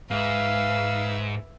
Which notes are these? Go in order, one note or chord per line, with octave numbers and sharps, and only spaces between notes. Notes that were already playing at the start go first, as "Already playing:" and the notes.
G#2 B4 E5 F5